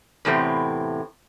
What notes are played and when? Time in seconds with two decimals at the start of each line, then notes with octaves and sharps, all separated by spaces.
0.25 E2 A2 C3 C4